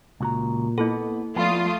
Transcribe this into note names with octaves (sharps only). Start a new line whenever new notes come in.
C#2 A#2 F#4 A#5
A#3 B3 E4 A4
F3 A3 B3 F4 D5 D#6